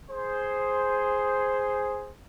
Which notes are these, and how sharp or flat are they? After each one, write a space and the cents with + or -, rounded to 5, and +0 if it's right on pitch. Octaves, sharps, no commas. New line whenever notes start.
G#4 +0 C5 +0